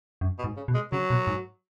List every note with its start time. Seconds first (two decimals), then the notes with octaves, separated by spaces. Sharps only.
0.21 F#2
0.39 B2
0.44 G#2
0.57 C#3
0.68 B2
0.74 G#3
0.92 C#3 F#3
1.10 B2
1.27 G#2